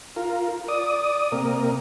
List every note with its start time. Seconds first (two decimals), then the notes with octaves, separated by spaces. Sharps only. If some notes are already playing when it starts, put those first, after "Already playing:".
0.16 F4 A#4
0.68 D5 D#6
1.32 C3 A#3 A#4